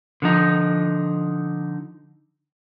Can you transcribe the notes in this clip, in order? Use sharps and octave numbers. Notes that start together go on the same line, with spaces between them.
D3 F3 D#4